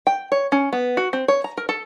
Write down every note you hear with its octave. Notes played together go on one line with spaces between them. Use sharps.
G5
C#5
C#4
B3
F#4
C4
C#5
A#5
A#4
A4